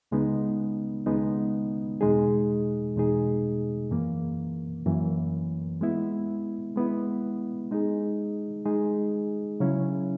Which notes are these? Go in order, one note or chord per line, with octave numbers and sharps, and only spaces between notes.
C#2 C#3 G#3 B3 D#4
C#2 C#3 G#3 B3 D#4
E2 B2 G#3 D#4 G#4
E2 B2 G#3 D#4 G#4
F#2 E3 A#3
F#2 E3 A#3
G#3 B3 E4
G#3 B3 E4
G#3 D#4 G#4
G#3 D#4 G#4
C#3 F#3 C#4 E4